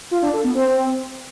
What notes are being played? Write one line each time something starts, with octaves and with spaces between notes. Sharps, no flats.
F4
D4
A4
B3
C4